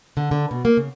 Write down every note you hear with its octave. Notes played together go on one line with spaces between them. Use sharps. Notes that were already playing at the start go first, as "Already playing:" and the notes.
D3
D3
B2
A#3
C#3